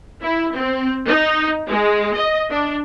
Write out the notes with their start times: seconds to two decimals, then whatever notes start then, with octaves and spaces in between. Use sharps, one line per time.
0.23 E4
0.56 C4
1.07 D#4
1.69 G#3
2.16 D#5
2.51 D4